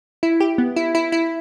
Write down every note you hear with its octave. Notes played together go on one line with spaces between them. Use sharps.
E4
G4
B3
E4
E4
E4